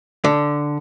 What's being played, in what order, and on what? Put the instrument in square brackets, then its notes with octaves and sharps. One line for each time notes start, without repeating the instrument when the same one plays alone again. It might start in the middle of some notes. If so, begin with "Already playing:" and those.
[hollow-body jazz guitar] D3